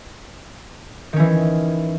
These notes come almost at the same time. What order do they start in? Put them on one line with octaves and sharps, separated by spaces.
D#3 C#4 E3